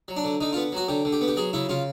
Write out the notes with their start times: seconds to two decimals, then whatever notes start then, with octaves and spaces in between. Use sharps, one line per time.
0.08 F#3
0.17 D4
0.25 D3
0.41 D3 D#4
0.53 F4
0.57 B3
0.72 F#3 F#4
0.88 D3 G4
1.05 D3
1.13 G4
1.21 B3
1.28 G4
1.37 F#3 G#4
1.53 C#3 E4
1.69 C#3 F4